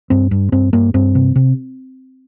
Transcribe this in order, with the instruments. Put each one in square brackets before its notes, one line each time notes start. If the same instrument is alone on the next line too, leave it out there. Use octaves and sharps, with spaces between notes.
[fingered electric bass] G2 C4
G2
G2 C4
G2 A#3
G2 C4
C3
C3